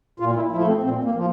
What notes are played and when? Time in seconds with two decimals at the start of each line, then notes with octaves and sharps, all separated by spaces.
0.20 A#2 F4
0.36 E4
0.51 F3 E4
0.56 A3
0.68 C4
0.83 A#2 C4
1.04 A#3
1.15 F3